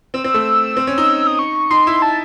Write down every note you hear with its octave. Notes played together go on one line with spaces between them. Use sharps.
C4 E6
C4
A3
C4
C#4
D#4
D#6
C#6
D#4 C6
E4
A5